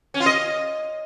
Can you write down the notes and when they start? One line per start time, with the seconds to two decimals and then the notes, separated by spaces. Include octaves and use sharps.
0.14 C#4
0.20 F4
0.26 D#5